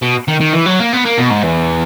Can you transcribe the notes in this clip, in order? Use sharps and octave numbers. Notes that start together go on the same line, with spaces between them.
B2
D#3
D#3
E3
F#3
A#3
B3
A#3
B2
G#2
E2